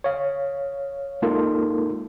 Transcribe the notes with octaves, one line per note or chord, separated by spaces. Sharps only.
C#5 F5
G#3 A#3 D#4 F4 A4 A#4